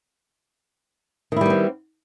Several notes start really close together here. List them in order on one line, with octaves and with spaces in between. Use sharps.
D#3 E4 G3 B3 C4